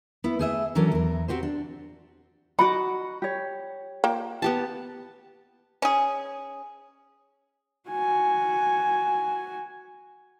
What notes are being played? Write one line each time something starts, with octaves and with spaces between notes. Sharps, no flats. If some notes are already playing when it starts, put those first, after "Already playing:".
B3 E4
A3 G#4 E5
E3 F#3 C#4 D4 A4 A#4
E2 A#4
C4 F#4 G4 C5
D4
D#4 F#4 D#5 F#5 B5 D6
G4 C#5
A#3 F4 G5
B3 G4 A5
C#4 G#4
F#4 G#5